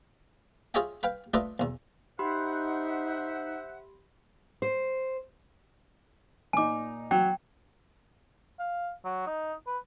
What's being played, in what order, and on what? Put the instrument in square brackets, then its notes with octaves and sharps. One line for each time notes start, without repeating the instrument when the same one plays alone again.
[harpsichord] F4 G#4 C#5 D#5 E5 G5
B4 F5 G5
A3 D4 F4 B4 D#5 E5
B1 E2
[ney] D#4 [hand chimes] G4 B5 C6 [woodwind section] C5 E5 F#5
[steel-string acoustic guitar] C5
[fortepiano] A#2 D#4 [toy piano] G#5 D6
[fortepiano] F#3 [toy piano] G5
[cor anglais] F5
F#3
D#4
B4